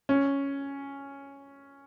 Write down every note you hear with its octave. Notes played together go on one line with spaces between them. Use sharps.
C#4